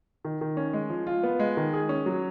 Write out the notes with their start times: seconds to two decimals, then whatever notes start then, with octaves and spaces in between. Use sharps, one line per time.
0.25 D#3
0.41 D#3
0.57 C#4
0.73 G#3
0.90 F3
1.07 F4
1.23 B3
1.39 G#3
1.57 D#3
1.73 G#4
1.89 C#4
2.06 F#3